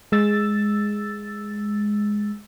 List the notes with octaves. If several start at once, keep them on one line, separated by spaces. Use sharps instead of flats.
G#3 E6 A6